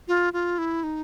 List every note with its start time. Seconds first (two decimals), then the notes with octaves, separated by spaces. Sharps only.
0.08 F4
0.33 F4
0.58 E4
0.83 D#4